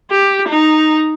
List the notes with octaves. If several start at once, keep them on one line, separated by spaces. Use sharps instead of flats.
G4
D#4